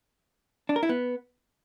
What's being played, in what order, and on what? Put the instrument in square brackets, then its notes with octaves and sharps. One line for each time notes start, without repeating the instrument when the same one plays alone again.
[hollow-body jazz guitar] D4
A#4
E4
B3